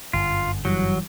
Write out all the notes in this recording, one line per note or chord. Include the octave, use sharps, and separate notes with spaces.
G1 F#2 D3 F4
E3 F#3 G3